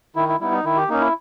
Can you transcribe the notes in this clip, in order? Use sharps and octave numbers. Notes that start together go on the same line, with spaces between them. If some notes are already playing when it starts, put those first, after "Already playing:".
D#3 E4
E4
G3 B3 D#4 E4
D#4
D#3 E4
G4
A#3 C#4 D#4
E4